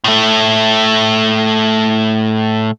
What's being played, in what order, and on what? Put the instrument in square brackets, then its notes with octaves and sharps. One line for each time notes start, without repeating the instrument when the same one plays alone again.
[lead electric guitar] A2 A3